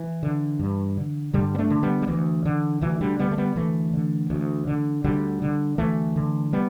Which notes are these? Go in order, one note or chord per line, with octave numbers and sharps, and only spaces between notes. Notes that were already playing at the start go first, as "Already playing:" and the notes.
Already playing: E3
D3
G2
D3
G2 D3 G3
B3
A3 D4
D3
G3 B3
G3
D2 E3
D3
D2 E3
D3 G3
D3 G3 B3
A3
G3 B3
D2 E3 A3
D3
D2
D3
D2 D3 G3
D3
D2 E3 A3
D3
G3 B3